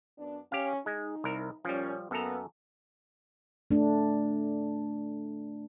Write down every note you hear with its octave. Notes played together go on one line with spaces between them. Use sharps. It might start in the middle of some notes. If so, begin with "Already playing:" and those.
F#2 B3 D4
C#4 G4 F5
G#3 D#4
C2 A#4
A#2 F3 G3 C#4
F#2 A#3 B3 A4 A#5
A3 D4